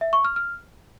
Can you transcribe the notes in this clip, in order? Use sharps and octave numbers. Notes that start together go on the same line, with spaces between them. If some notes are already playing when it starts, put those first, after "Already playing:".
E5
C#6
F6
F6